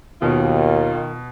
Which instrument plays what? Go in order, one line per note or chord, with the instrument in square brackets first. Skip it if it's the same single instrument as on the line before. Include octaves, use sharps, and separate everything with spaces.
[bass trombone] D#2 [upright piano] B2 [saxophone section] D#3 F4